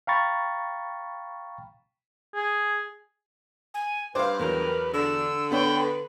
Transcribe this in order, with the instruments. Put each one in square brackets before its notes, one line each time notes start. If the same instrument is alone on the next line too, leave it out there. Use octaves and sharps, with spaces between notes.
[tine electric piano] F5 G5 A#5 B5 C#6 A6
[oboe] G#4
[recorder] G#5
[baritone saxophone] G2 [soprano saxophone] B4 [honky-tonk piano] C5 F5 [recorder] D6
[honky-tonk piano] E2 F#3 [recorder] A#4
[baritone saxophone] D3 [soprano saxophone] D4 [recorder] E6
[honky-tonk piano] B3 D4 C#5 [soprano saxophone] G5 [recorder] B5
[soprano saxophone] B4